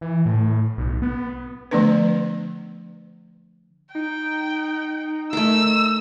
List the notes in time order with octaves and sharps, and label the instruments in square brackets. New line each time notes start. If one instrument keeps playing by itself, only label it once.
[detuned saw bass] E3
A2
B1
B3
[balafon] D3 F3 A3 B3 D4 B4
[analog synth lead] D#4 [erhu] G5
[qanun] A3 A#4 [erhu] E6